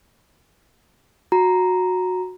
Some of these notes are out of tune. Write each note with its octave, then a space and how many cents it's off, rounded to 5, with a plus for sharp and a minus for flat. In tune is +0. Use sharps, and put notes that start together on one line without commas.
F#4 -15 A#5 +0